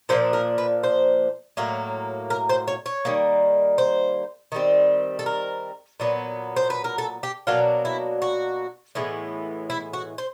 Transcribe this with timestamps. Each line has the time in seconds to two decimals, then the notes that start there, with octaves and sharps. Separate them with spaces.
0.09 A#2 F3 A#3 D4 C5
0.33 A#4
0.58 B4
0.84 C5
1.57 A2 F#3 A#3
2.30 A#4
2.49 C5
2.68 C#5
2.86 C#5
3.05 D#3 G3 A#3
3.78 C5
4.52 D#3 G3 C4
5.19 A4
5.26 A#4
6.00 A#2 F#3 B3
6.56 C5
6.70 B4
6.84 A#4
6.98 A4
7.23 G4
7.47 B2 F#3 A#3 D4 F4
7.85 E4
8.22 F#4
8.95 A2 E3 G#3 B3
9.70 E4
9.93 F#4
10.18 C5